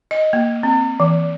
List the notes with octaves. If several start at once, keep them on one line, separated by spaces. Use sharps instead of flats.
D#5
A#3
C4
E3